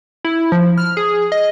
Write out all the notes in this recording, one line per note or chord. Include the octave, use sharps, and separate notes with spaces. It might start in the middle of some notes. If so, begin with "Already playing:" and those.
E4
F3
F6
G#4
D#5